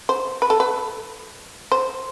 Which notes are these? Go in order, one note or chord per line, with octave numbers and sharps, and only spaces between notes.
C5
B4
A4
B4
C5